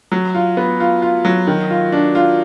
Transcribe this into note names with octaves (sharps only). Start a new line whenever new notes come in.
F#3
F4
B3
F4
F4
F#3
D#3
F4
D4
F4